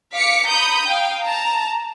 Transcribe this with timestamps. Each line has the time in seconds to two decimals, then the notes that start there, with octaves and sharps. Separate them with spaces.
0.11 F5 D6 B6 C#7
0.48 A#5 B5 D#6 G6
0.87 F5 G5
1.24 A5 A#5